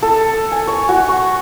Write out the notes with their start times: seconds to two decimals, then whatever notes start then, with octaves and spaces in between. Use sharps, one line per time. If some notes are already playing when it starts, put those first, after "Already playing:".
0.02 A4
0.51 G#5
0.67 C#5
0.89 F#4
1.08 C#6